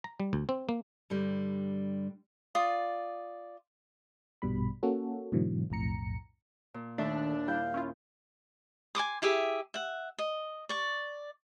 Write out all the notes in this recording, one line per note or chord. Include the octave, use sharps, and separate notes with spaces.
A#5
G3
D2
C4
A#3
G2 D3 G3
F4 D5 D#6
A#1 G2 B2 G3 B5
A#3 C#4 F#4 A4
G#2 B2 D3 E3 F#3
B1 F2 A2 A#5 C#7
A#2
D#2 D#3 A3 D4 A4 E5
G3 E4 F5 G6
C#4 E4 F4
G#5 C6 D6 D#6
E4 G4 G#4 E5
E5 F#5
D#5
D5 C#6